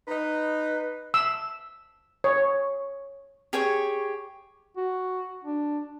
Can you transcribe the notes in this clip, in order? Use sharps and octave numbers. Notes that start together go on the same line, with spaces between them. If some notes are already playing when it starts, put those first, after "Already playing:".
D#4 B4
E6
C#5
G4 G#4 C#5 C#6
F#4
D4